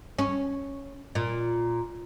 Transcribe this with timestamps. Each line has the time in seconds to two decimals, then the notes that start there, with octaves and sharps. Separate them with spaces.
0.18 C#4
1.15 A#2